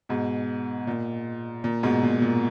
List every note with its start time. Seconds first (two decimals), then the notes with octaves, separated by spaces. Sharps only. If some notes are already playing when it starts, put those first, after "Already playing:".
0.09 G#2 B2
0.87 A#2
1.64 A#2
1.83 G#2 B2
2.03 A#2
2.22 A#2